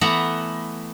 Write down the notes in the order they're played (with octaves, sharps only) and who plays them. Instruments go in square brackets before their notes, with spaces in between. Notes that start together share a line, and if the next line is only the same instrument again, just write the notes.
[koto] E3 A3 B3 F#5 A#5